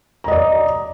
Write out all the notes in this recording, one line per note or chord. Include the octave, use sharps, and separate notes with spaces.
D5 D#5 A#5